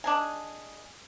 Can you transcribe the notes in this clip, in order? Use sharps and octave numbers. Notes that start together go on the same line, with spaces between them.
D4 D#4 G#4